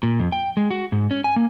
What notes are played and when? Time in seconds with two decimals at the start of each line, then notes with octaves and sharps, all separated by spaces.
0.03 A#2
0.19 F2
0.32 G5
0.57 G#3
0.71 F#4
0.92 G#2
1.11 C#4
1.24 G#5
1.36 A#3